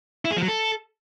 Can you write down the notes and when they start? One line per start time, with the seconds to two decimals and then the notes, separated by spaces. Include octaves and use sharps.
0.25 E4
0.31 G#4
0.37 F3
0.42 F#3
0.48 A4